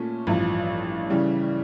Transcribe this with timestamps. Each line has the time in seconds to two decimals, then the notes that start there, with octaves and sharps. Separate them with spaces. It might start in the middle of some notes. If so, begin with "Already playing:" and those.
Already playing: A#2 A3 C#4
0.27 A1 G2 F3
1.10 C#3 E3 G3